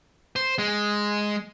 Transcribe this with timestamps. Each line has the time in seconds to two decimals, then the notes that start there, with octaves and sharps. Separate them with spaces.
0.36 C5
0.58 G#3